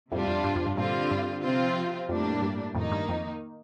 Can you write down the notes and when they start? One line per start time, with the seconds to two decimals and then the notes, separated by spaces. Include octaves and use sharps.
0.12 F2 A2 C3 G3 D4 F4
0.28 F2
0.44 G2
0.56 F2
0.66 G2
0.77 G2 A#2 D3 G3 C4 F4
1.11 G2
1.43 C3 F3 C4 F4
2.09 F2 A2 G3 A#3 D4
2.42 G2
2.75 F2 A2 D#3 A#3 D#4
2.92 G2
3.09 F2